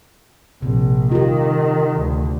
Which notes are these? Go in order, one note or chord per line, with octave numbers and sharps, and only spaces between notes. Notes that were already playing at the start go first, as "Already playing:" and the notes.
A#1 C3
D#3 F4 G4
D2